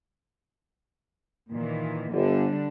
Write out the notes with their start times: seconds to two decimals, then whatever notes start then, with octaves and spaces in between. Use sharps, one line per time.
1.53 A#2 D#3 E3
2.14 G1 D3 G3 D4